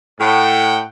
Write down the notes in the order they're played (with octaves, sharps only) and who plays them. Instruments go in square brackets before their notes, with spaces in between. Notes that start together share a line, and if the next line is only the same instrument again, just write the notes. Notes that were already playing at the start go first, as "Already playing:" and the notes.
[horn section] A2 F#5 G5